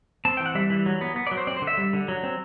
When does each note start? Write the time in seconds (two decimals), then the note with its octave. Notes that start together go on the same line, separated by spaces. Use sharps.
0.25 C4 A5
0.37 E3 G5
0.46 F#5
0.55 G3 E5
0.70 E3
0.86 F#3
1.01 B3
1.16 B3
1.27 D5
1.31 F#3
1.37 C5
1.47 C4 D5
1.57 C5
1.62 D3
1.67 E5
1.78 G3
1.93 D3
2.08 F#3
2.23 C4